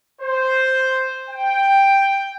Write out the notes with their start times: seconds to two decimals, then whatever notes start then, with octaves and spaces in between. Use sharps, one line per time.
0.22 C5
1.29 G5